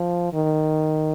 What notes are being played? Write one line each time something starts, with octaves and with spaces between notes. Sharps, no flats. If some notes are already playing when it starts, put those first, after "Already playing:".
Already playing: F3
D#3